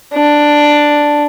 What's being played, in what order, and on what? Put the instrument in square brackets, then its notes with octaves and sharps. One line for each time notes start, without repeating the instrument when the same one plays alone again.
[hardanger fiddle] D4